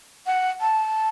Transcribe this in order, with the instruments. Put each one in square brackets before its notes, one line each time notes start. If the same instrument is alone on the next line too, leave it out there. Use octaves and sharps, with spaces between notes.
[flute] F#5
A5